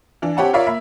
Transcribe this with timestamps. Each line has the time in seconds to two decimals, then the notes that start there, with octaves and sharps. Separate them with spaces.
0.22 E3 D4
0.37 C4 G4 C#5 F#5 A5
0.53 F4 A#4 C#5 D5 E5 F5
0.67 A#3 E5 B5